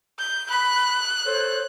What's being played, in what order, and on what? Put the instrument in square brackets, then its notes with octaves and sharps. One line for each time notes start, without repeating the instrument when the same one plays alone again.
[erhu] G6
[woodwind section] B5 [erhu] F#6
[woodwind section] A4 C5 C#5